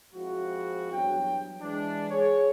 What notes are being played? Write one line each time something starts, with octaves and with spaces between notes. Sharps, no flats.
F3 G#3 C4 E4 F#4
E2 G2 F#3 G5
E3 G#3 D4
G#4 C#5